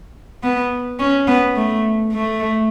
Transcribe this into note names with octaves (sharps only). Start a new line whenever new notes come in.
B3
C#4
B3
A3
A3